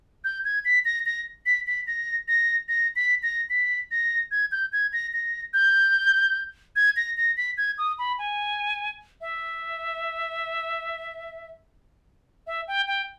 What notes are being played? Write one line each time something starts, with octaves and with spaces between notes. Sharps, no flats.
G6
G#6
B6
A#6
A#6
B6
B6
A#6
A#6
A#6
B6
A#6
B6
A#6
G#6
G6
G#6
A#6
A#6
G6
G#6
A#6
A#6
B6
G#6
D#6
B5
G#5
E5
E5
G5
G5